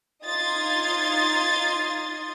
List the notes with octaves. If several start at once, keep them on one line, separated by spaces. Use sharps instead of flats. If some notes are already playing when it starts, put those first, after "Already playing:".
D#4 F4 C6 D#6 G#6 A6